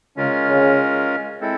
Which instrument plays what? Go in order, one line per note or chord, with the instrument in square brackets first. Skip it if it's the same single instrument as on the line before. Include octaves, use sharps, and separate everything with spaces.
[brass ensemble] C#3 [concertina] G#3 C#4 F4 A#4
[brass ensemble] C#3
[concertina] G#3 C4 E4 A4